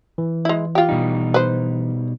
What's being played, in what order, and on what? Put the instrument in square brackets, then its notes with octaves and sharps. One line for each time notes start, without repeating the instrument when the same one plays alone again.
[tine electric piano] E3
[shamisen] G#3 E4
F4 G4
[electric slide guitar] B2 G3 D#4
[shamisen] B4 C5